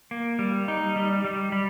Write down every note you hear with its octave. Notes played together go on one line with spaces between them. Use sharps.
A#3
G3
D#4
G3
G3
G3